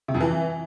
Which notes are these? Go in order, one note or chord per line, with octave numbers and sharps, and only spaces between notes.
C3
F2
E3